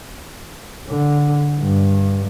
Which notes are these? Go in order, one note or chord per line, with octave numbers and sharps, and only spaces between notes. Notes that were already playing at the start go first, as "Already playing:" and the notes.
D3
G2